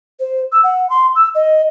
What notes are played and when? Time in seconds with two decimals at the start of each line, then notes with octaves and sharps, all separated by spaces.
0.20 C5
0.52 E6
0.64 F#5
0.90 C6
1.15 E6
1.35 D#5